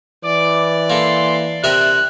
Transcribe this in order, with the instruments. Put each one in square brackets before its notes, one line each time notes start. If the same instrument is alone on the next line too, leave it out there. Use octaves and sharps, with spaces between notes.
[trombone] E3 [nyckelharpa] D5 [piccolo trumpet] D6
[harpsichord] A#3 A4 [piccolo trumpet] C6
[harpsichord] C3 A#4 E5 [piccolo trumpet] F#6